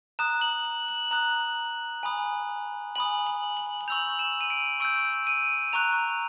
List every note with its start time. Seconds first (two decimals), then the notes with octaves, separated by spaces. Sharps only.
0.19 A#5 D#6 F#6 E7
0.41 F#7
0.65 F#7
0.88 F#7
1.11 A#5 D#6 F#6
2.03 G#5 B5 D#6
2.95 G#5 B5 D#6 F#7
3.27 F#7
3.57 F#7
3.81 F#7
3.88 C#6 E6 G6 F7
4.19 E7
4.41 D#7
4.50 D7
4.80 C#6 E6 G6 D7
5.27 D#7
5.73 A#5 C#6 F#6 F7